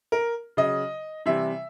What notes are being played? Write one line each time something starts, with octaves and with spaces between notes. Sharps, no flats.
A#4
C#3 F#3 D#5
C3 E3 G3 E5